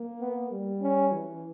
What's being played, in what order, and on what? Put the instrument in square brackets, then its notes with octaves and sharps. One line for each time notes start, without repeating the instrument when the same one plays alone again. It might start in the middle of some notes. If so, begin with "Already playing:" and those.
Already playing: [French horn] A#3
[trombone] B3
[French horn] G3
[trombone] C#4
[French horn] E3